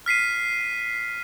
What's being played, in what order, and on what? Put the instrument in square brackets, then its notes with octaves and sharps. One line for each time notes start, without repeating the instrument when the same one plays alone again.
[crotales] F6 B6 C7 D#7